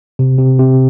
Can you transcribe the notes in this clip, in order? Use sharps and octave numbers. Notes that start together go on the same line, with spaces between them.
C3
C3
C3